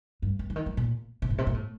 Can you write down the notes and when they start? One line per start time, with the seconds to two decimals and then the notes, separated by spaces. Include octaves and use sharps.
0.22 G2
0.39 G2
0.50 D3
0.56 D#3
0.66 F3
0.77 A#2
1.22 C3
1.30 A2
1.38 C3
1.47 A#2
1.54 A2